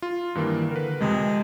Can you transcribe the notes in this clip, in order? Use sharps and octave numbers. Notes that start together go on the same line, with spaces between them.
F4
G2 D#3 E3 A#3
D3 A#4 B4
F2 C3 G#3